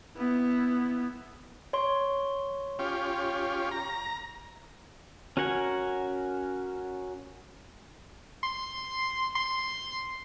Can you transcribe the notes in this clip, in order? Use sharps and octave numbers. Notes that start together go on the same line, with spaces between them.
B3 E4
C#5 C6
C#4 F4 G4
A#5
C#4 F#4 A#4 F#5 G#5
C6
C6